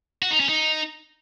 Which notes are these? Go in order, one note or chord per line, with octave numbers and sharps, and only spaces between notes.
F#4
D#4
C#4
D#4